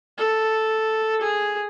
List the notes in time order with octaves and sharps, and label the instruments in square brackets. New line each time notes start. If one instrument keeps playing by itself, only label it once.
[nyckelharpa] A4
G#4